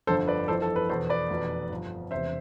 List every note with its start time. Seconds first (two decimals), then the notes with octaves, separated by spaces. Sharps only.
0.07 G1 F2 D3 F3 A4 C5
0.27 B4 D5
0.48 G1 F2 E3 A4 C5
0.62 A4
0.76 B4
0.89 E2 B2 A4 C5
1.09 B4 D5
1.30 F1 E2 B2
1.70 G1 G2 F3
2.11 E1 E2 C3 C5 E5